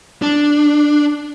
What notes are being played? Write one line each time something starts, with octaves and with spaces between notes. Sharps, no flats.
D4